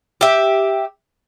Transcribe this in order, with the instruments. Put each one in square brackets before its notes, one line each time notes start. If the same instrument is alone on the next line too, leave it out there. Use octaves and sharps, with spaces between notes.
[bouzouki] G4 E5